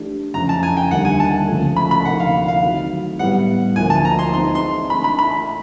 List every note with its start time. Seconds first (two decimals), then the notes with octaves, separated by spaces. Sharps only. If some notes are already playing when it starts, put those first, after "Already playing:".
Already playing: E3 A3 D4 G4
0.34 F2 C#3 E3 A#5
0.49 A5
0.63 G#5
0.77 G5
0.91 D#2 D3 G3 F#5
1.05 G#5
1.20 A5
1.48 C#2 C#3 F3 A3
1.76 B5
1.91 B5
2.05 D2 C3 F3 A#3 D#4 F#5
2.20 F5
2.48 F5
2.62 D#3 F#3 A3 C4 E4
3.19 A2 E3 G3 B3 F#5
3.76 D2 D3 F3 A#3 G#5
3.90 A5
4.05 A#5
4.19 C6
4.33 E3 G#3 C4 D#4 C6
4.55 C6
4.90 E3 A3 D4 B5
5.04 B5
5.19 B5